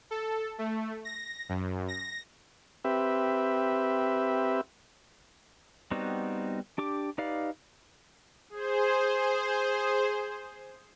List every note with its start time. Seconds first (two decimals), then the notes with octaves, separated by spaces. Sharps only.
0.11 A4
0.58 A3
1.05 A#6
1.49 F#2
1.88 A#6
2.84 C4 G4 B4 E5
5.91 G3 B3 C4 D#4 F#4
6.78 D4 G4 D6
7.18 D#4 G4 B4 D5 F5
8.50 G#4 C5